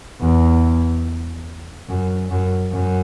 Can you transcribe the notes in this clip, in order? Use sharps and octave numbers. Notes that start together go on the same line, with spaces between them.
E2
F#2
F#2
F#2